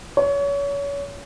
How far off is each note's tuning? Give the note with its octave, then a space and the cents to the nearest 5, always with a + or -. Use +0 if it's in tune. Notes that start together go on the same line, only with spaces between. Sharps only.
C#5 +30